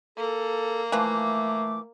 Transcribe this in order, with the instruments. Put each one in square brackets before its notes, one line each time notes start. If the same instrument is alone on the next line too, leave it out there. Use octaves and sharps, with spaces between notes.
[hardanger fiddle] A#3 [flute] A4
[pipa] E3 F3 [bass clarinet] A3 [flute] D6